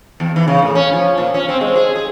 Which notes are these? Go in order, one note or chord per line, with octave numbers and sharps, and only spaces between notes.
E2
E3
C#3
A2
C#4
F3
A#2
C#4
C4
G#3
G#4
G#4